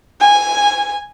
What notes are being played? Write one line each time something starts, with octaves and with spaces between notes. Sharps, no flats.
G#5